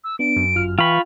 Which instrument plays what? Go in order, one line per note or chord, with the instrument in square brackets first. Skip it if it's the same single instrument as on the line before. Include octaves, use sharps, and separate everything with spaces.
[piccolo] E6
[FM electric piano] B3 D4 [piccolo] D7
[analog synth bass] F#2
[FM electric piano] G1 F4 F6
[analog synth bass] E3 [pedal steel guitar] F4 B5 [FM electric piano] G5 [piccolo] C#6